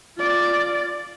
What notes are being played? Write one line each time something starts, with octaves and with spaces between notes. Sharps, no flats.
F4 D5